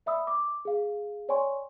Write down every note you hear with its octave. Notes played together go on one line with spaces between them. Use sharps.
D5 E5 B5 D#6 E6
D6
G#4 F5
C#5 D5 G5 G#5 C6 C#6